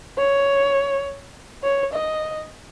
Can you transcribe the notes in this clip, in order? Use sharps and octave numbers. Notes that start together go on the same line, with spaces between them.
C#5
C#5
D#5